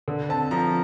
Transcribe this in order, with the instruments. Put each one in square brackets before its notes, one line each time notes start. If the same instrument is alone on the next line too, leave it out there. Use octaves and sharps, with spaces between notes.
[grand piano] D3
C4 A5
F3 A#5